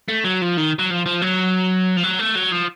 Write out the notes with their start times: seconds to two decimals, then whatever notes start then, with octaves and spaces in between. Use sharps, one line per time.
0.08 A3
0.25 F#3
0.42 F3
0.57 D#3
0.79 F#3
0.90 F3
1.06 F3
1.22 F#3
1.97 F3
2.03 F#3
2.19 A3
2.36 F#3
2.52 F3